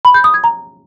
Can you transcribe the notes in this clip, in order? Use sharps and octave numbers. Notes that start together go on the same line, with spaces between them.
B5
G6
D#6
G#6
A#5